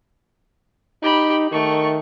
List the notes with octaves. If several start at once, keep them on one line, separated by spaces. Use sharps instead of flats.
D#4 G4 B5
D#3 A3 C#6